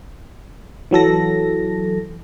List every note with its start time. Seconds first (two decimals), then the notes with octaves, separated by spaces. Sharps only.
0.91 E3 F#3 A4 A#6